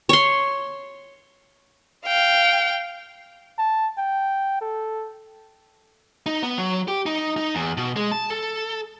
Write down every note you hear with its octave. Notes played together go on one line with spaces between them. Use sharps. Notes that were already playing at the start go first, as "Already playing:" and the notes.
C#5 C6
F5 G5
A5
G5
A4
D#4
B3
F#3
G4
D#4
D#4
E2
B2
G#3
A5
A4